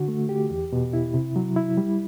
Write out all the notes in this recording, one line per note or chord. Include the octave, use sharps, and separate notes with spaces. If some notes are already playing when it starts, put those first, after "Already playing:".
Already playing: D3 F#4
A3
G4
E2
B2
E4
C3
F#3
E4
G3